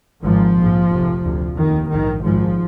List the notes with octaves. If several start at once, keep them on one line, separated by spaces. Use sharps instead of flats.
G#1 G#2 F3
A#1 G#2
F1 F2 C3
D2 C3
F1 D#2 D#3
A#1 G#2 D#3
G#1 G#2 F3